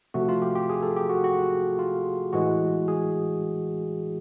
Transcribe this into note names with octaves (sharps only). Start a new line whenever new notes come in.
C3 F3 A3 F#4
F4
G4
G4
G#4
A4
G4
F#4
F#4
F4
A2 E3 G#3 F#4
G#4